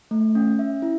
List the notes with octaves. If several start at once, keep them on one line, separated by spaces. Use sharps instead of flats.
A3
C#4
E5
E4